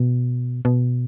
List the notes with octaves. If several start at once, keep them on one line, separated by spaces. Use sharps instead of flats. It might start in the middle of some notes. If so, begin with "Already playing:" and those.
Already playing: B2
B2